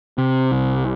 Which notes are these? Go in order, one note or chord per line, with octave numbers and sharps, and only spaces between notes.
C3
C2